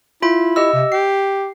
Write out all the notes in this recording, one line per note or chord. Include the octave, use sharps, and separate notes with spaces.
E4 F4 B5
G4 D#5 E6
C3
G4 C7